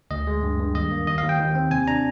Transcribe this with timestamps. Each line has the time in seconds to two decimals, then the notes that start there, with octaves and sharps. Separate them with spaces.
0.11 D2 D#5
0.27 G#3
0.43 G2
0.59 G2
0.75 D#2 D#5
0.91 A#3
1.07 D#2 D#5
1.18 F5
1.23 D#2
1.29 G5
1.40 D#2
1.55 C4
1.71 C3 G#5
1.87 D4 A#5